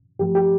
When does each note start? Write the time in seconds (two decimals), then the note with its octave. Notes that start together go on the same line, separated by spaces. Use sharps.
0.19 G2 F3 A3 G4
0.35 G4